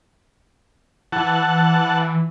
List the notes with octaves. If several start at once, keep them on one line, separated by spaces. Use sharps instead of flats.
E3 F#5 A5